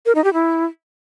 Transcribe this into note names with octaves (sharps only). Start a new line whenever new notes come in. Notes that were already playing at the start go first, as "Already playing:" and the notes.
A#4
D#4
G4
E4